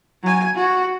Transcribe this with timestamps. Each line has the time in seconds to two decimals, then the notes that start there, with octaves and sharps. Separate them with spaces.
0.23 F#3 G#5
0.56 F#4